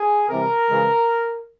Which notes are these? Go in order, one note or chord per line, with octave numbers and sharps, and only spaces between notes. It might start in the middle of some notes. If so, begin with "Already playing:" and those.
Already playing: G#4
C3 E3 G3 A#4
C#3 E3 G#3 C#4